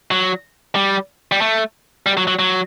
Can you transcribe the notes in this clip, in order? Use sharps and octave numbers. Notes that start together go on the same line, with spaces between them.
F#3
G3
G3
A3
G3
F#3
F#3
F#3